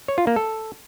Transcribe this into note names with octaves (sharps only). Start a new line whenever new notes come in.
C#5
F4
A#3
A4